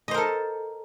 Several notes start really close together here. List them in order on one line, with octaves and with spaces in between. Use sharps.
D#5 C5 A#4 A4